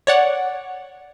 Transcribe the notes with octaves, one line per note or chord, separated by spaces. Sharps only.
C#5 D5 F#5